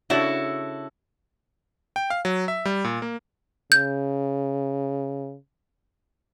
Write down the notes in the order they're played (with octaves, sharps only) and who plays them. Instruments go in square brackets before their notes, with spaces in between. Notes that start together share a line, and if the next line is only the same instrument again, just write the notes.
[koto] C#3 D4 A5 [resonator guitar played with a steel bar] E4 F#4 A4
[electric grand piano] G5
F5
F#3
E5
G3
A#2
A#3
[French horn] C#3 [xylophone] G6